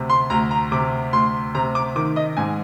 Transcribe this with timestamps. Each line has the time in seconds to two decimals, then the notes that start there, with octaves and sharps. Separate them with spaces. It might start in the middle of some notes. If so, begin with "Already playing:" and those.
Already playing: D2 C3
0.10 C6
0.30 D2 A#5
0.51 A#5
0.72 C3 D6
1.13 D2 C6
1.55 C3 A#5
1.75 D6
1.96 D#3 D6
2.16 D#5
2.37 G#2 G#5